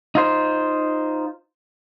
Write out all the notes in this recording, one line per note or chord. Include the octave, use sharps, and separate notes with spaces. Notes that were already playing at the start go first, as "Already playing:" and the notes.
D#4 F4 C5